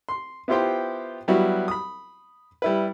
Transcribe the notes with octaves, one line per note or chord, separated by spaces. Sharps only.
C6
B3 E4 F4 G4 C5 G5
F#3 G3 B3 E4 F#4
B5 D#6
G3 E4 B4